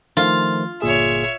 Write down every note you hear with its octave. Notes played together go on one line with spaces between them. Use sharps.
D#3 F3 A3 F4
G1 A#2 G#4 C#5 E5